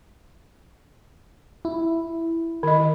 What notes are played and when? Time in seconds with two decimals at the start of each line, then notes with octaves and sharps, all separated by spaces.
1.65 E4
2.63 D#3 D#5